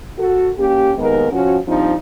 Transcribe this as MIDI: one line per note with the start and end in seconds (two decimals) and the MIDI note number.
0.19 0.49 66
0.19 0.49 69
0.58 0.93 58
0.58 0.93 61
0.58 0.93 67
0.98 1.28 39
0.98 1.28 51
0.98 1.28 56
0.98 1.28 59
0.98 1.28 70
1.32 1.57 53
1.32 1.57 61
1.32 1.57 66
1.67 1.94 53
1.67 1.94 55
1.67 1.94 60
1.67 1.94 62
1.67 1.94 63